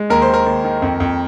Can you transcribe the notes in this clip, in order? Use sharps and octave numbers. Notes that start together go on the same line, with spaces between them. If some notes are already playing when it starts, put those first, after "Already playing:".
Already playing: G#3
D#2 A#4
C5
D#3 A#4
D#2
D#3
F2
F2